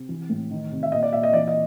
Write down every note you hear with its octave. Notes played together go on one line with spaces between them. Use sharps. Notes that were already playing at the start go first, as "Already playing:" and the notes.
Already playing: C3
E3
A2
D#3
C3
E5
A#2 D#5
D5
A#2 E5
D#5
E3 D5
D#5